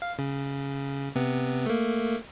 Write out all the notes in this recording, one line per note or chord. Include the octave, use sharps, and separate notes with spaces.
F5
C#3
C3 B3
A3 A#3